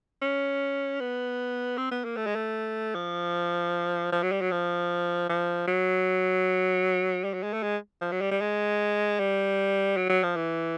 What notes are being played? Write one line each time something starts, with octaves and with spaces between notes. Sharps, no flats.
C#4
B3
C4
B3
A#3
A3
G#3
A3
F3
F3
F#3
G3
F#3
F3
F3
F#3
G3
F#3
G#3
A3
G#3
F3
F#3
G3
G3
G#3
G3
F#3
F#3
F3
E3